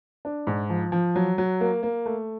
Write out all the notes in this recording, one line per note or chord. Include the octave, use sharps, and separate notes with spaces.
D4
G#2
F3
F3
F#3
F#3
A#3
A#3
A3